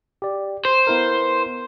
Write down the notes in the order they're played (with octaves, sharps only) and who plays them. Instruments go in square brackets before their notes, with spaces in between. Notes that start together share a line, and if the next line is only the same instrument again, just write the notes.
[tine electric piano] G4 D5
[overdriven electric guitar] C5 [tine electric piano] G6
[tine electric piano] B3 E4 A#4